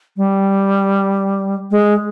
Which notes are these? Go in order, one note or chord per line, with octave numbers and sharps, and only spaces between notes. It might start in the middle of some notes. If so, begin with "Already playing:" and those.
G3
G#3